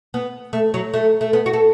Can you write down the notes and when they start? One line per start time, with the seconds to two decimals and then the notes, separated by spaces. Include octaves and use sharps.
0.14 B3
0.53 A3
0.74 F#3
0.94 A3
1.21 A3
1.33 B3
1.46 F#4
1.53 A4